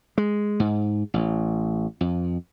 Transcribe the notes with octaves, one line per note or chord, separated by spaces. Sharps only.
G#3
G#2
A1
F2